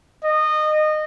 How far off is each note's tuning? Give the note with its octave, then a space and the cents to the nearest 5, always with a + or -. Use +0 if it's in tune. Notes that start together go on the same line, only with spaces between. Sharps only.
D#5 -20